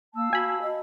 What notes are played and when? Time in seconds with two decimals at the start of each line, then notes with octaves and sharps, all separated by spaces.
0.15 A#3 F5 A5 E6
0.33 F#4 G#5 B5
0.62 D#5